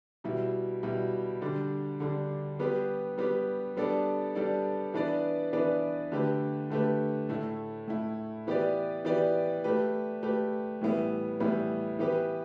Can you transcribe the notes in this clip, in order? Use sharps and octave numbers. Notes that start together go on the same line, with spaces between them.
B2 G3 E4
B2 G3 E4
D3 G3 D4
D3 G3 D4
G3 B3 G4 B4
G3 B3 G4 B4
G3 B3 D4 A4 D5
G3 B3 D4 A4 D5
E3 B3 D4 B4 D5
E3 B3 D4 B4 D5
D3 A3 G4 B4
D3 A3 G4 B4
A2 A3 E4
A2 A3 E4
E3 B3 G4 B4 D5
E3 B3 G4 B4 D5
A3 G4 B4
A3 G4 B4
A2 E3 G3 B3 E4
A2 E3 G3 B3 E4
E3 B3 G4 B4